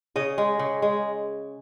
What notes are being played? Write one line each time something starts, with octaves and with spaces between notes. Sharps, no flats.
C#3 D#5
G#3
C#3
G#3